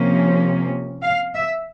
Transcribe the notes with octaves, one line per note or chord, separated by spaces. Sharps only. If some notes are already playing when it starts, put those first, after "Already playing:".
Already playing: C3 F3 A#3 C#4
F5
E5